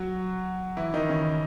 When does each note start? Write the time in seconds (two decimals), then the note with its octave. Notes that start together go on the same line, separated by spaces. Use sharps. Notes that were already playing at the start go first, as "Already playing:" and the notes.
Already playing: F#3 F#4
0.77 E3 E4
0.94 D#3 D#4
1.09 C#3 C#4